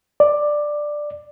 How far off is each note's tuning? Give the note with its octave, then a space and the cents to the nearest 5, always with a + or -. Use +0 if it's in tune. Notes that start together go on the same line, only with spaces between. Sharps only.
D5 +10